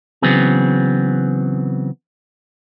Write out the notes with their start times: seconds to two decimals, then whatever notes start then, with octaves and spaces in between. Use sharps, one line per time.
0.22 C#3 E3 F#3 B3 C4 G#4